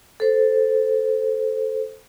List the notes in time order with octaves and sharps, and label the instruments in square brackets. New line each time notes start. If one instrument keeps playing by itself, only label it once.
[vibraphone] A4 C5